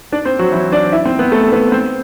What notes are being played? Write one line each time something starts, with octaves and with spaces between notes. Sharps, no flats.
D4 D5
C4 C5
F#3 F#4
E3 E4
D4 D5
E4 E5
C4 C5
B3 B4
A3 A4
B3 B4
C4 C5